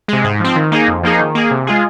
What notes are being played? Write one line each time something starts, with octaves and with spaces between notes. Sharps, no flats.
C3 G#3
G#2
F3 C4
D#3
A#3 D#4 G#4
F2
F3 A#3 D#4 G#4
D#3
A#3 G#4
C3
G#3 F4 G#4